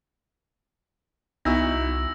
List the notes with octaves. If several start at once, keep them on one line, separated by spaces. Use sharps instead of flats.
C2 B3 D#4 E4 F#4 E6 A#6